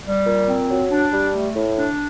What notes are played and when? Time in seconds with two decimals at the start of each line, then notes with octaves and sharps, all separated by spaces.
0.05 G3
0.27 A#2
0.48 C4
0.70 F#3
0.91 D4
1.13 G3
1.34 A3
1.55 A2
1.77 D4